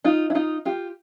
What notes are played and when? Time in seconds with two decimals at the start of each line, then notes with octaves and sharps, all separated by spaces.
0.04 D#4 F4
0.30 E4
0.35 D#4 F4
0.65 F4 G4